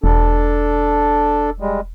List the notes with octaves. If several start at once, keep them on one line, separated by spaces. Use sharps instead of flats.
E1 D4 A4
G3 G#3